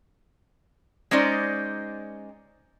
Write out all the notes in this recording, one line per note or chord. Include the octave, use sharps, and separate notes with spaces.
G#3 C#4 D#4 C5 D5